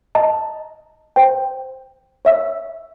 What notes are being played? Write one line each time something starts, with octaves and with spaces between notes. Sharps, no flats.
D#5 A5 A#5
C5 G5
C#5 E5 E6